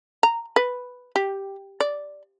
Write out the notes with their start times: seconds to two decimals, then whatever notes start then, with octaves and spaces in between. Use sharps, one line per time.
0.23 A#5
0.56 B4
1.16 G4
1.80 D5